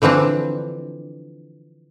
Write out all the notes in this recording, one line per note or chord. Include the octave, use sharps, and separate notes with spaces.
D3 E3 F3 C4 D4